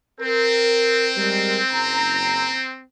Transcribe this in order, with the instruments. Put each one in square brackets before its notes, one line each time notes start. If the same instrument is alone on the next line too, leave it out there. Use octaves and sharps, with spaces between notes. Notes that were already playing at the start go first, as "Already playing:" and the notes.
[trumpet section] C4 [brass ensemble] A#4
[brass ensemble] G3 G#3 A#4
F#1 A#5